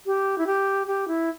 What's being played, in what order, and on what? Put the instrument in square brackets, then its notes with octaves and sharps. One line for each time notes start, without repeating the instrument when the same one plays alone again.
[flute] G4
E4
G4
G4
E4